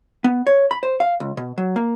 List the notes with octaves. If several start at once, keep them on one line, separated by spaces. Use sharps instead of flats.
B3
C#5
B5
C5
F5
C#2
B2
F#3
A#3